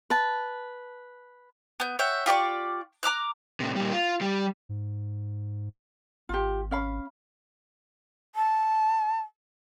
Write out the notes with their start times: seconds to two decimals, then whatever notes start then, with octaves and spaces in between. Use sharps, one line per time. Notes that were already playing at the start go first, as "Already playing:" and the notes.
0.10 B4 A5
1.80 B3 G6
1.99 C#5 E5 F#5 G5
2.26 F4 G4 D5 C#6
3.03 A#5 D6 F6 F#6
3.60 A2 C3
3.76 A#2 G3
3.92 F4
4.21 G3
4.69 G#2
6.29 G#1 F4 G4
6.71 C#4 F5 B5
8.35 A5